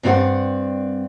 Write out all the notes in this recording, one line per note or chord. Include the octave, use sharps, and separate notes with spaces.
G2 C4 D4 A#4 D5 F#5